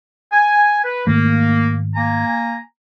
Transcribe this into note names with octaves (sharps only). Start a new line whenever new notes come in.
G#5
B4
G#2 D#3 A3 A#3
A#3 G#5 A#5